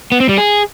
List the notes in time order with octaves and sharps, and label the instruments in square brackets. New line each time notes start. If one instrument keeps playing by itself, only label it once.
[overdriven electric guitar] B3
C4
G3
G#4